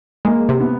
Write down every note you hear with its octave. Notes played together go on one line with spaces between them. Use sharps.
G#3 A#3
C3
B3